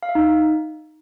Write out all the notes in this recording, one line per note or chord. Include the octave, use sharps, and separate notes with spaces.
F5
E5
D#4